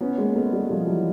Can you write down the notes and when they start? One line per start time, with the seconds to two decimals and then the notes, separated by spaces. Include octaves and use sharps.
0.01 B3 C#4
0.18 G#3 A#3
0.35 A3 B3
0.52 G3 A3
0.70 F3 G3
0.87 E3 F#3